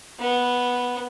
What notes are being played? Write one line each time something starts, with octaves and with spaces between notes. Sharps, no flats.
B3